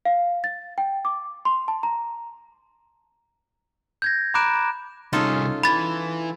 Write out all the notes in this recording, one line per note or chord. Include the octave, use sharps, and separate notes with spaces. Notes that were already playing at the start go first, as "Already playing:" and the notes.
F5
A6
G5
D6
C6
A5
A#5
G6 G#6 A#6
A#5 B5 D6 F#6 D7 E7
C2 C#4 D#4 F4 G#4 A4
E3 B5 A6